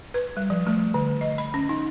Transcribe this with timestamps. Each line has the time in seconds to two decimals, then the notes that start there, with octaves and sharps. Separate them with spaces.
0.14 B4
0.37 G3
0.50 F3
0.67 A3
0.94 D3
1.21 D#5
1.38 B5
1.54 C#4
1.69 D#4